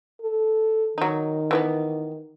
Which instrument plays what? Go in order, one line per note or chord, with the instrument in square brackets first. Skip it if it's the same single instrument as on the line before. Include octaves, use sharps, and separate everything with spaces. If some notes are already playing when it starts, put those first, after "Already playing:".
[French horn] A4
[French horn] D#3 [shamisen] F#3 D#4
[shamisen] E3 F#3 B3